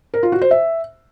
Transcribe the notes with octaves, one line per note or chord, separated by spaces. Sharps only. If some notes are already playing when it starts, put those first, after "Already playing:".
A#4
F4
F#4
C5
E5